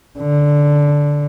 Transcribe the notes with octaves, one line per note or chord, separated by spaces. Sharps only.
D3